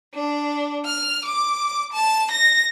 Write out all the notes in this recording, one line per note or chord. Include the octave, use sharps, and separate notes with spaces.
D4
F6
D6
A5
A#6